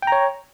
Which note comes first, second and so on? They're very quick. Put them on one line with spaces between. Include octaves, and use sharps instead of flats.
G5 A#5 C#5